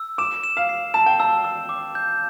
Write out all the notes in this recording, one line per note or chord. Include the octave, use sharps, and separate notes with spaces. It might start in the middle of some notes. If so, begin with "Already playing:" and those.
Already playing: E6
D6 E7
E7
F5
C7
A5 E7
G5
A5 E6
E6
D6
G6